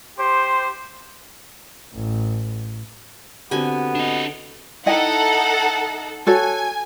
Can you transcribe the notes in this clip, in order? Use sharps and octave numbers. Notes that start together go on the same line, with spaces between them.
G4 C5
A1
D3 B3 C4 F#4 G4 G#5
D4 D#5
D#4 E4 A4 D#5 F#5 G5
F#4 A4 C#5 G#5